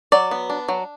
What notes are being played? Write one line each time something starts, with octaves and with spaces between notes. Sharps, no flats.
F#3 D5
B3
D4
F#3